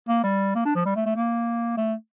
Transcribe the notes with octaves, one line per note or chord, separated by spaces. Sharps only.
A#3
G3
A#3
D4
F3
G3
A3
A3
A#3
A3